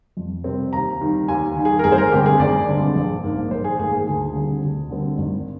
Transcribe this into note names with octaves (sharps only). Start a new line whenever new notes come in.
F2
C3 G3 C4
D#2 A#5
D#3 G3
D#2 G#5
D#3 G3
G#4
A#4
G#1 G#4
C5
A#4
G2 D3 G#3 C4 G4
G#4
G#1 D5
G2 D3 G#3 C4
A#1
G#2 D#3 A#3
A#1 C5
G#4
G#2 D#3 A#3 G#4
G#4
D2 G#4
D3 G3 C4
D2
D3 G3 C4
G#1